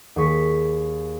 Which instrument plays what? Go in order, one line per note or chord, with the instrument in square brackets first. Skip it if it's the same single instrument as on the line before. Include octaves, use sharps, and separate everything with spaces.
[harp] D#2 G#4 C#6 B6